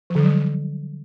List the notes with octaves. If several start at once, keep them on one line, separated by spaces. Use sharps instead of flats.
F3
D3
F#3
G3